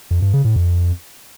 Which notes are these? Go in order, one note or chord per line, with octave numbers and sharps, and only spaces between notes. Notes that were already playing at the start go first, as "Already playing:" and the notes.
F2
G2
C#3
A2
F2